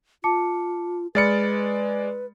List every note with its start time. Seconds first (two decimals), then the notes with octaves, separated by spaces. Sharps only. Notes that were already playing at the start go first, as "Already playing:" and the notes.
0.24 F4 A5 D6 C#7
1.15 G#3 B4 D5 B5 F6 A6 C#7